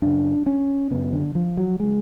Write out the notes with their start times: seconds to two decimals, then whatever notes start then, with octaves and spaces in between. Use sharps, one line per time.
0.02 F#2 C#3 D4
0.46 C#4
0.91 F#2 C#3 B3
1.13 D3
1.35 F3
1.57 F#3
1.80 C#3 G#3